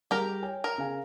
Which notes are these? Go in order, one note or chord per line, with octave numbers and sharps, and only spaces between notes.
G3 G4 G#4 A#4
C#5 G5 G#5
A#4
C#3 F5 G#5